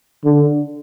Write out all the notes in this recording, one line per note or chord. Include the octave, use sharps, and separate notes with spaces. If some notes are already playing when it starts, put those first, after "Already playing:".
D3